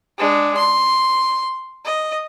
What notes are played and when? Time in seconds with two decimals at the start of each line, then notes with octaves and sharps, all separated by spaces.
0.18 G#3 D4
0.57 C6
1.85 D#5